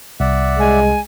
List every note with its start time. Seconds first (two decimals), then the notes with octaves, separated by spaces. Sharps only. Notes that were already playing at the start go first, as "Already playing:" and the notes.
0.20 C2 D5 E5 F#5
0.59 G#3 G#5